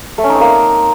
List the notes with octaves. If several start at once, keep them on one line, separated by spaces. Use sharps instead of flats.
A3
C#4
D#4
C4
A#3